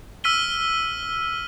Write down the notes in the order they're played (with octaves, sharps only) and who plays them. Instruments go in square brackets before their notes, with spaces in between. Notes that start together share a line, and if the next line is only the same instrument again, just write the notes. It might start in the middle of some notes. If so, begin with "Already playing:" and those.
[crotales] E6 F6 B6 D#7 G7